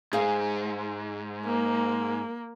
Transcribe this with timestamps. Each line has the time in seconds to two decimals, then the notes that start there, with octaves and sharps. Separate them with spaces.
0.13 G#2 G#4 F5
1.45 A#3